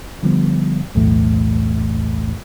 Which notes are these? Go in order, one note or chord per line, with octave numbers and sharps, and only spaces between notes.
D3 F3 G3 B3
B1 E2 A2 E3 A3